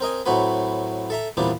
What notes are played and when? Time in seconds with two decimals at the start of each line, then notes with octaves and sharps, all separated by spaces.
0.01 C4 A#4 D#5 G#5
0.26 A2 F#3 C4 F#4 B4
1.10 A4 E5 A#5
1.37 E2 A#2 E3 G3 C4 D4